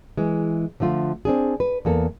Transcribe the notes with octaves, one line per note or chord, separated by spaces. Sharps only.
E3 G#3
D3 F3 A3 F4
C4 D4 G#4
B4
E2 A#3 A4